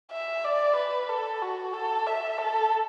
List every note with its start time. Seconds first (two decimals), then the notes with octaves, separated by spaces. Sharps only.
0.12 E5
0.44 D5
0.76 B4
1.09 A4
1.42 F#4
1.73 A4
2.07 E5
2.38 A4